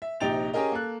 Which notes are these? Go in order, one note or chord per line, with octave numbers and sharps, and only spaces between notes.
E5
A#1 C3 D#4 G5 A6 F7
C#4 G4 G#4 A#4 D#5
A#3 A4 F#6